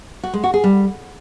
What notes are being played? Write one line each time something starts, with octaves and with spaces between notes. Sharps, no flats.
F#4
G#3
F#4
G#4
G3